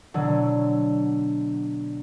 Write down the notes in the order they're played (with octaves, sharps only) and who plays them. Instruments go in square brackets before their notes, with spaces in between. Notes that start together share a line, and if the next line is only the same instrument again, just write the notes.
[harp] B2 D3 F#3